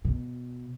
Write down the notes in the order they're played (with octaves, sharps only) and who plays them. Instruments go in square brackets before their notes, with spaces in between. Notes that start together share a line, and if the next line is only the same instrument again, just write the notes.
[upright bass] B2